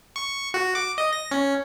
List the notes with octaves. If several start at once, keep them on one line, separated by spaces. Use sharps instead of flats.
C#6
F#4
D6
D#5
A#6
C#4